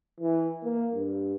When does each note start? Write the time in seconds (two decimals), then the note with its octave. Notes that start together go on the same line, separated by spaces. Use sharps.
0.20 E3
0.64 A#3
0.95 G2